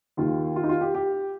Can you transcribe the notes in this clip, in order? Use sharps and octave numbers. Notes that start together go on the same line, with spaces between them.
D#2 D#3 F4
F4
D#4
F4
G4
G4